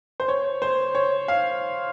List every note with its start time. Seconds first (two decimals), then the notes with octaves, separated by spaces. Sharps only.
0.20 C5
0.28 C#5
0.62 C5
0.95 C#5
1.28 F5